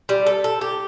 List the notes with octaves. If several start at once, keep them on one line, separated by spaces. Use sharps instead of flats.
G3
A4
A4
G4